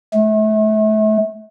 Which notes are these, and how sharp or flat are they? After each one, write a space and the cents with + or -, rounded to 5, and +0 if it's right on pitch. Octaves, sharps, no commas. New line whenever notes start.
A3 -30